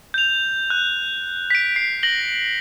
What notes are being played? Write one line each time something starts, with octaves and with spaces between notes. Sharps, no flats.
G6 F7
F#6
B6 D7
C7
A#6 F#7 G7